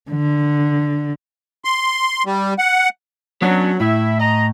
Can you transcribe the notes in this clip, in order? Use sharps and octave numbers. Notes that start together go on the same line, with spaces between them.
D3
C6
G3
F#5
F#3 B3 C#4 D4
A2 E4 E5
D#5 A#5